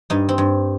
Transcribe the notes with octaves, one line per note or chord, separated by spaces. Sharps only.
G2 D#4
C4
G2